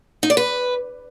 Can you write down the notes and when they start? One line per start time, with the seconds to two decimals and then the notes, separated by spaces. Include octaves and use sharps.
0.23 D#4
0.30 D5
0.37 B4